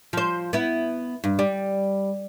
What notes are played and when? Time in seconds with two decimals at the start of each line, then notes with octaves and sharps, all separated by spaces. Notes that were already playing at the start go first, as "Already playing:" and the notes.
0.13 F3 C5
0.53 B3 E4
1.24 G2
1.39 G3